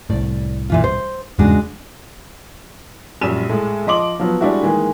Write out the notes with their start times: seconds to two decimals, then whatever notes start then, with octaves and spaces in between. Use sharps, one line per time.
0.10 C2 A2 D5
0.70 A#2 E3 F4
0.84 C5
1.39 E2 G#2 C#3 G#3 D4 F#4
3.21 A#1 F#2 G3 D#7 E7
3.49 A2 G#3
3.87 F3 D#5 C6 D6 F#7
4.20 F3 F#3 B3
4.41 G3 G#3 D4 E4 F#4
4.63 D#3 E3 G#3 A#3